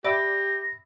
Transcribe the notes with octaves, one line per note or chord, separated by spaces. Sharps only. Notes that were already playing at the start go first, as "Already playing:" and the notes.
G4 D5 E5 B5 E6 A#6